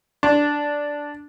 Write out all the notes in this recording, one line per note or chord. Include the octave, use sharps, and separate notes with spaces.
D4